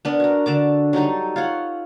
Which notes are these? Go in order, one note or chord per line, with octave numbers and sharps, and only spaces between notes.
B3 D4 A#4
F#4 A#4
D3 A5 D6
F#3 G3 D#4 A4
F4 C#5 F#5